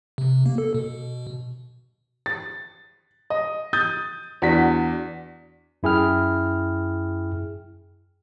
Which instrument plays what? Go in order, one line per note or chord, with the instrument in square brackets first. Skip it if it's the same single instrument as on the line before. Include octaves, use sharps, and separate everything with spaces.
[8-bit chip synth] C3
A#3
A4
B2
[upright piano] A6
D#5
D#6 G6 A6
E2 D4 F#4 B6
[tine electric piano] F#2 E4 G#4 G5 F6